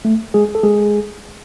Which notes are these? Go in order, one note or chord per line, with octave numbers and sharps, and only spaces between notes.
A3
G#3 G#4
A4
G#3 G#4